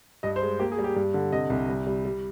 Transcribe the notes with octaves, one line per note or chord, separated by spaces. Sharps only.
G2 D#5
C5
G#3
A#3 G4
G#4
G3
G4
G2
D3
C3 D#5
C2
G3
G3
G3